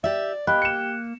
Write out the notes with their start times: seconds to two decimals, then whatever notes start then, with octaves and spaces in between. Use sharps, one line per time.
0.04 G4 D5 E5
0.47 A#3 G4 D#5 B5 F#6
0.62 C#7 E7